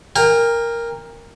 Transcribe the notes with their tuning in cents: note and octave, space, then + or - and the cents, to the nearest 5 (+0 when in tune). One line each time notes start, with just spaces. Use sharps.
A#4 +0 G5 +40